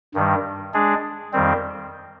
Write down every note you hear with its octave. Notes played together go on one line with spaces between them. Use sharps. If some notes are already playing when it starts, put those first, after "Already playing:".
G2 D#3 G3
G#3 D4 G#4 D5
F2 D#3 G3 C4